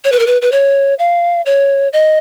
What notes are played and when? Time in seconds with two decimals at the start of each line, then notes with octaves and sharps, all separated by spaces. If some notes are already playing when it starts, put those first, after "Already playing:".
0.04 C#5
0.12 B4
0.19 A#4
0.27 B4
0.42 B4
0.52 C#5
0.99 F5
1.46 C#5
1.93 D#5